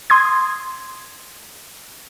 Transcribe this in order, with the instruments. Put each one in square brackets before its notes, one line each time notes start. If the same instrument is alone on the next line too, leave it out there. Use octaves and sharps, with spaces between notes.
[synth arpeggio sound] C6 D#6 G#6